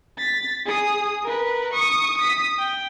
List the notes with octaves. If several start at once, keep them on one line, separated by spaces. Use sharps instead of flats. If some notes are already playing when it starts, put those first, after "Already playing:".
A6 B6
G#4 D#6
A#4 B4
C#6 D#6
D#6 B6
G5